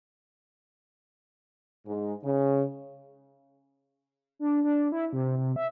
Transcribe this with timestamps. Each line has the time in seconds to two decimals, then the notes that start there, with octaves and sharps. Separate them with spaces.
1.86 G#2
2.24 C#3
4.39 D4
4.64 D4
4.92 E4
5.13 C3
5.37 C3
5.56 E5